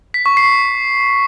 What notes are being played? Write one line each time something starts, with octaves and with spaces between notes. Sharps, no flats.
B6
C#6
C7